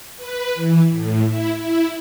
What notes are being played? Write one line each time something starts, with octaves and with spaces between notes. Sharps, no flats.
B4
E3
A2
E4
E4